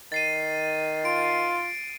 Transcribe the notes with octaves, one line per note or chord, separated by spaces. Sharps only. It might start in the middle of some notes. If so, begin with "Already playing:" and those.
D#3 A6 C7 D#7
F4 D7